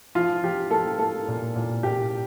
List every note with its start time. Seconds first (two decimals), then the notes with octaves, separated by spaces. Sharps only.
0.15 F3 F4
0.43 F3 G4
0.71 A#3 A4
0.99 A#3 A4
1.28 A#2
1.56 A#2
1.83 A#2 G4